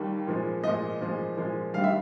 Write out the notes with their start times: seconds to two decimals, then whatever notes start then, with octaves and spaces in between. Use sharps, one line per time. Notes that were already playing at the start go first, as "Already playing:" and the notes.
Already playing: D#2 D#3 G3
0.27 A#2 F3 G#3
0.64 A#2 F3 G#3 D#5
1.01 A#2 F3 G#3
1.37 A#2 F3 G#3
1.74 G2 D#3 G3 F5
1.84 E5